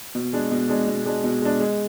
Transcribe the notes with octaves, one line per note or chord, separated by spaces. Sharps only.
B2
G#3 D4
B2
G#3 D4
B2
G#3 D4
B2
G#3 D4
G#3